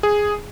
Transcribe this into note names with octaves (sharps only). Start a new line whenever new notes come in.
G#4